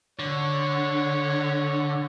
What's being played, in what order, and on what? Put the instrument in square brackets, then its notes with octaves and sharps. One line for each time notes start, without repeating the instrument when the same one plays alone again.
[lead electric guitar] D3 [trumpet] C#5